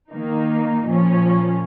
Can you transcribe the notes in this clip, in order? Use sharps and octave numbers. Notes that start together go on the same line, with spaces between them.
D#3 A#3 D#4
A#2 F3 C#4